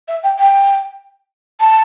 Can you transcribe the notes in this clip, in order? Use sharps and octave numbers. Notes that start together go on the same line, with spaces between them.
E5
G5
G5
A5